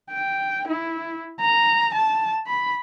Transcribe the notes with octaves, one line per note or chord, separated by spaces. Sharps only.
G5
E4
A#5
A5
B5